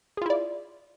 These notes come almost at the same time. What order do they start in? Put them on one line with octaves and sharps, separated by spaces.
G#4 F4 E4 D5